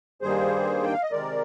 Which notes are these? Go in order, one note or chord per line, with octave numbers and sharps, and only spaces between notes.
G2 D#3 G3 A#3 G#4 C5
G5
F5
D#5
C3 D#3 G#3 A#4 D5